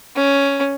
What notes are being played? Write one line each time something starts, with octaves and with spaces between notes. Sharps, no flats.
C#4